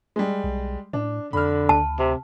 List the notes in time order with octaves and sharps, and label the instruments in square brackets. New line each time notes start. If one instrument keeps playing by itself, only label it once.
[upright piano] G3 G#3
[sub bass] B1
[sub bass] A2 [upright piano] D4
[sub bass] F2 [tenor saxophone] D3 [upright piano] B5 F6
[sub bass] D2 [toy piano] A5
[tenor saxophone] C3